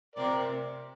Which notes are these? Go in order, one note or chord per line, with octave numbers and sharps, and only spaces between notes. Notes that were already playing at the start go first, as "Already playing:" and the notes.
C3 C4 A#4 D5